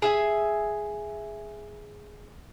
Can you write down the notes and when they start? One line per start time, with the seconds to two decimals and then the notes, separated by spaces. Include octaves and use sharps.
0.02 G#4 E5 G#5